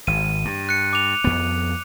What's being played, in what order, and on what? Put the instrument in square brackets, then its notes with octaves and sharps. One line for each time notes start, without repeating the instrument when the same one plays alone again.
[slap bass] G#1 [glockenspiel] D#7
[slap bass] G2
[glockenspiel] F#6 C#7
D6 F7
[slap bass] F2 B3